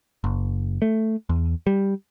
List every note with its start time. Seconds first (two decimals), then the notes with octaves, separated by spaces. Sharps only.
0.24 F#1
0.82 A3
1.29 E2
1.67 G3